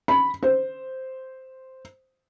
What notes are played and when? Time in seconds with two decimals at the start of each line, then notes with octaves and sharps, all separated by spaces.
0.08 B5
0.43 C5